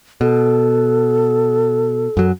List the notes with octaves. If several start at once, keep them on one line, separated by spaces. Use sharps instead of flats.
B2 A4
F#2 F#3